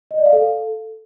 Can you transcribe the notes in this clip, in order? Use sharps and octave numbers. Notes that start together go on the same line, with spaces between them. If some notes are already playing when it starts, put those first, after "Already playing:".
D#5
D5
F5
A4